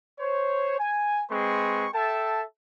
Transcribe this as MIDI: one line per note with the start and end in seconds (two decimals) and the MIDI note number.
0.20 0.79 72
0.20 0.79 73
0.79 1.22 80
1.30 1.87 56
1.30 1.87 60
1.30 1.87 71
1.30 1.87 84
1.30 1.87 85
1.93 2.42 69
1.93 2.42 76
1.93 2.42 79
1.93 2.42 81